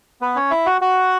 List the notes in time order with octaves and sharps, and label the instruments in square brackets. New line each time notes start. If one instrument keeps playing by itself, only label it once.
[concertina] B3 B4
C#4 C#5
E4 E5
F#4 F#5
F#4 F#5